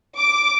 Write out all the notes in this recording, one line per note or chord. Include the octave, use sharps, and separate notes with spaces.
D6